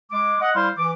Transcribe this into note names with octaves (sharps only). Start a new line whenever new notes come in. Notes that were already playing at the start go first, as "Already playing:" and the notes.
G#3 D6
D#5 F#5
G3 E4 C5 F5 C6
E3 D6